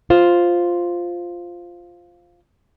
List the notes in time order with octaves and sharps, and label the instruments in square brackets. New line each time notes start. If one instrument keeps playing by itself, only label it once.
[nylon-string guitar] F4 C5